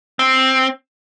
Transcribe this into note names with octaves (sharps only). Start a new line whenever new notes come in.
C4